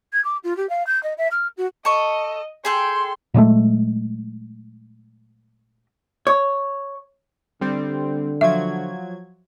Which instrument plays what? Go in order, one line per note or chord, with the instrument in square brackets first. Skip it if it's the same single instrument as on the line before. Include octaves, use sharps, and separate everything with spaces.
[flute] G#6
D6
F4
G4
F5
G6
D#5
E5
F6
F#4
[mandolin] A4 C#6 [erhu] D#5
[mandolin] G#4 A4 G5 [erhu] C6
[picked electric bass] A#2 F#3 G#3 A3
[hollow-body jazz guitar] C#5
[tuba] D3 [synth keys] G3 C4
[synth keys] F3 F#3 G#6 [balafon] E5